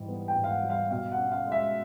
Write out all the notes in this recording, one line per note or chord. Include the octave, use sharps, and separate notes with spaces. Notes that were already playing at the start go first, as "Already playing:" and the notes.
Already playing: G#2 E3 G3
B3
G5
G#2
F5
F#5
G3
F5
B2 F5
F#5
C#4
F5
G#3
E5